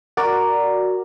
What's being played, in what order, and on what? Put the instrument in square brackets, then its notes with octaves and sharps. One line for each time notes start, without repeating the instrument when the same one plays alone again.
[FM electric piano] F#4 D5 [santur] A#4